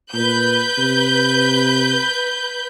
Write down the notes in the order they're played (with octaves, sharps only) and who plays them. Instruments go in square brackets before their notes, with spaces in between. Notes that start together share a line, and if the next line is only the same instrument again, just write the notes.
[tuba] A#2 [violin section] B4 G6
[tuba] C3